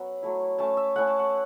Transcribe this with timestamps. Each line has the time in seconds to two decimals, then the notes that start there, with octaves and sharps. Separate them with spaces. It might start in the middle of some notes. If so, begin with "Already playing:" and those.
Already playing: F#3 B3 C#4 E5 F#5
0.22 F#3 A3 E4
0.58 A3 C#4 E4 A5
0.77 E5
0.96 A3 C#4 E4 F#5
1.07 A5
1.19 F#5